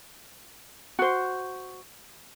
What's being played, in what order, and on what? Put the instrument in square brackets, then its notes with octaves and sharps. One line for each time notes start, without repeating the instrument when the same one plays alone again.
[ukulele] F#4 C5